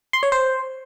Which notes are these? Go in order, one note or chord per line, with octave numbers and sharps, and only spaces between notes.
C6
C#5
C5